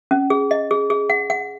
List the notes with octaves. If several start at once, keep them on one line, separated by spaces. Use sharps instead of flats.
C#4
G#4
D#5
G#4
G#4
F#5
F#5